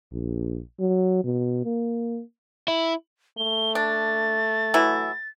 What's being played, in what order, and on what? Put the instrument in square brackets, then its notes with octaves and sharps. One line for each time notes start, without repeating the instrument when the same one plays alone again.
[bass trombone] A#1
F#3
B2
A#3
[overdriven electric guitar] E4
[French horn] A3 [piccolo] G7
[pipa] D4 [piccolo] A6
[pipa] E3 F#3 E4